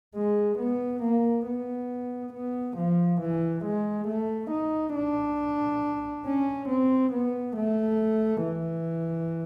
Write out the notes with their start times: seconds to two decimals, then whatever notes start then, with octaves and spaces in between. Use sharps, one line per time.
0.15 G#3
0.59 B3
1.03 A#3
1.46 B3
2.33 B3
2.77 F3
3.21 E3
3.65 G#3
4.08 A3
4.51 D#4
4.95 D4
6.26 C#4
6.69 C4
7.12 B3
7.56 A3
8.43 E3